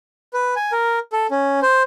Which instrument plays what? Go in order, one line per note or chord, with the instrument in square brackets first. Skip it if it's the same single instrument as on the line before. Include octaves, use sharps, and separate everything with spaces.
[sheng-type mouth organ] B4
G#5
A#4
A4
C#4
C5